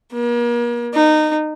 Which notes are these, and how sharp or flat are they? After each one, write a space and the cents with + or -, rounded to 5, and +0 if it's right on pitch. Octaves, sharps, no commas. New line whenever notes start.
A#3 +40
D#4 -20